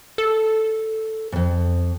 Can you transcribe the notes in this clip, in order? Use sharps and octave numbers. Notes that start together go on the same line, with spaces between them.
A4
F2 G#2